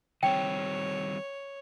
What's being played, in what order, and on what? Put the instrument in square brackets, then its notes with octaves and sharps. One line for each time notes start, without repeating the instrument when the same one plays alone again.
[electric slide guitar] D#3 G3 C4 [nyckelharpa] C#5 [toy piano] G5